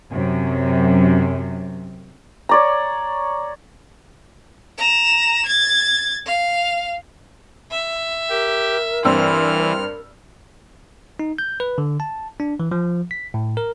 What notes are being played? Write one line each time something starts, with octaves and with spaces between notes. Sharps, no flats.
F#2 C3
C#5 D5 A#5
A#5 E7
G#6 A6
F5
E5
G4 A#4
G2 E3 C4 E6 F6
D#4
G6
B4
D3
A5
D4
E3
F3
B6
A2
A#4